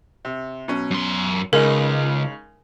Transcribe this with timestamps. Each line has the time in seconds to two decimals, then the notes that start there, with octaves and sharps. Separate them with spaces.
0.25 C3
0.68 B2 F#3 C#4
0.91 F#2 C6
1.53 C#2 C#3 G#3 D#4 A#4